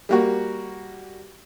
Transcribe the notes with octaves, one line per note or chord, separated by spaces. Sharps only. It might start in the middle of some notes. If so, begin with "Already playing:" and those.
G3 A#3 F#4